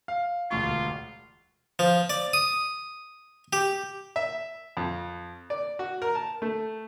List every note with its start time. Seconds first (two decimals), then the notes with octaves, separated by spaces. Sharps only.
0.08 F5
0.51 E1 D2 F4 C#6
1.79 F3
2.10 D5
2.33 D#6
3.53 G4
4.16 E5
4.77 F2
5.50 D5
5.79 F#4
6.02 A#4
6.15 A5
6.42 A3